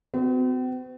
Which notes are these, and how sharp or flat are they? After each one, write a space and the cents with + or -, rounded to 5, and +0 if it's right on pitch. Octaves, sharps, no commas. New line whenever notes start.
C4 -45 F#4 +0